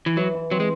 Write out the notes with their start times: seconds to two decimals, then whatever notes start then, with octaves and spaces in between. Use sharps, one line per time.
0.06 E3
0.17 E3 F#3
0.34 E3
0.51 F#3 C4
0.60 G#3